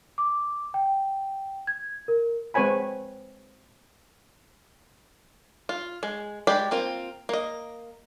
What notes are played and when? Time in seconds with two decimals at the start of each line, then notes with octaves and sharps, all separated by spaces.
0.18 D6
0.74 G5
1.67 G#6
2.08 A#4
2.54 G#3 C4 B4 C#5 G#5 B5
5.69 F4
6.03 G#3
6.47 G#3 G4 D5 B5
6.71 A#3 C4 F4
7.29 A#3 D#5